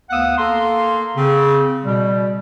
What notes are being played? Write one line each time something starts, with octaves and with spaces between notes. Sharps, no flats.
D2 B3 F5 F#5 D#6 E6
A#3 A4 F5 C6
C#3 C4
B2 G3